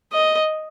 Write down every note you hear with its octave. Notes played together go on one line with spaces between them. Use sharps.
D#5